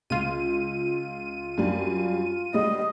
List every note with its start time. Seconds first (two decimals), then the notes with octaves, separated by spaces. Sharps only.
0.10 C#2 F4 D#7
1.58 F#2 G3 D4
2.54 G3 G#3 D#5